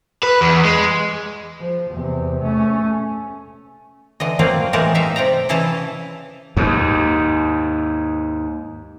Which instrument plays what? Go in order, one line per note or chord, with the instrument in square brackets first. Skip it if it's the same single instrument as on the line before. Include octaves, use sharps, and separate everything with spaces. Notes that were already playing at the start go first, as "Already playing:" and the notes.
[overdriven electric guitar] B4
E2
G#3
[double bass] F3
E2 C3
A3 C#4
[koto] D3 E3 D#5
F3 F#3 A#3 C4 D5 F5
A2 E3 G#3 G4 A#4 A5
D#4 E5 F5
C3 D5 G5 A#5
C#3 E3 E4 D#5 A5 A#5
[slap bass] D#2 G#2